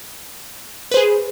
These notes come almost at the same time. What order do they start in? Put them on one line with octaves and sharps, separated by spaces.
B4 C5 G#4